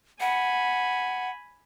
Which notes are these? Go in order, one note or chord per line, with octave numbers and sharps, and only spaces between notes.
F#5 G#5 B5